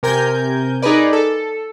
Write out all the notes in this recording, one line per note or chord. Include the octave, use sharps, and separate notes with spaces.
C3 A#4 G#5 G6
D#4 G#4 A#4 B4 D5
A4